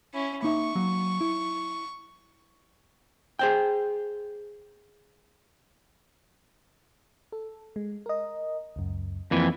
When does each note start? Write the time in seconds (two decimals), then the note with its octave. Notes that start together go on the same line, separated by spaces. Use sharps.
0.14 C#4 E4
0.43 A#3 D#4 E5 C#6
0.75 F#3 A#3
1.21 E4
3.39 G#4 C5 G5
7.32 A4
7.76 G#3
8.06 A#4 D#5
8.76 C#2 F#2
9.31 F2 E3 A#3